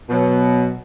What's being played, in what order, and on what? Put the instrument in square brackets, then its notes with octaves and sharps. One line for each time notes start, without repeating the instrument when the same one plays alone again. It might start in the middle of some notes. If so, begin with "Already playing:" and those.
[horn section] B2 F#3